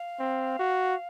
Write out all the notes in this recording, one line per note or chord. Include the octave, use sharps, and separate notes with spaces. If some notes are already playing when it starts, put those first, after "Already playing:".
Already playing: F5
C4
F#4